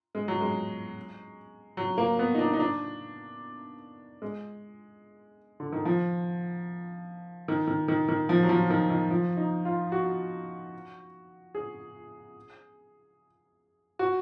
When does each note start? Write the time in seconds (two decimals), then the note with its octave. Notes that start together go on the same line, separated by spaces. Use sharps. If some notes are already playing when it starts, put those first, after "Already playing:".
0.15 G#3
0.28 F#3
0.41 G#3
1.77 F#3
1.98 A#3
2.19 B3
2.35 D#4
2.39 D4
2.53 D#4
2.60 D4
4.22 G#3
5.60 D3
5.72 D#3
5.85 F3
7.48 D#3
7.67 D#3
7.88 D#3
8.08 D#3
8.29 F3
8.43 F#3
8.49 F3
8.70 D#3
8.90 D#3
9.10 F3
9.37 D#4
9.65 F4
9.92 F#4
11.55 G#4
13.99 F#4